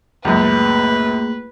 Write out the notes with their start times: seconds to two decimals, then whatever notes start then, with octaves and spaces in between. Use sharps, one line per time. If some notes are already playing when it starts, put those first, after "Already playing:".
0.25 C#2 F#2 A3 A#3 G#4 B4